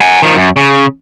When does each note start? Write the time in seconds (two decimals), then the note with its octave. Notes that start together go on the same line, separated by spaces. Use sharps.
0.01 F#5 G#5
0.22 D#3 F3
0.36 F#2
0.56 C#3